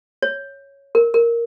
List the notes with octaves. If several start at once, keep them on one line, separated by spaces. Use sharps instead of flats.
C#5
A#4
A#4